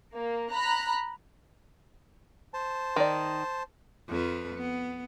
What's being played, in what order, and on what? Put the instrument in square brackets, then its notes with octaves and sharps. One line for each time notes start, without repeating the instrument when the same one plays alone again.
[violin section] A#3
A#5 B5 F#6
[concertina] C5 A5
[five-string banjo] D#3 D5
[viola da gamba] F2 F3 B4
B3